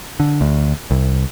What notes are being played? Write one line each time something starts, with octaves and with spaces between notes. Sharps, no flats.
D3
D2
C2